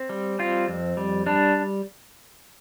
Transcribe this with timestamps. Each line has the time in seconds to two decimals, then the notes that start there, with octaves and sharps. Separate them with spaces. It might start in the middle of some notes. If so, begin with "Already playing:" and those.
Already playing: C4
0.09 G3
0.39 C4 F4
0.68 F2
0.97 G3
1.26 G3 D4